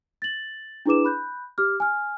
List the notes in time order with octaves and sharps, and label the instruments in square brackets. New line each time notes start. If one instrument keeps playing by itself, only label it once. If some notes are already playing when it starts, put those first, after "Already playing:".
[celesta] A6 F#7
D4 E4 G#4 B4 D6 E7
B5 F#6 G6
G4 D6 F6
G#5 F6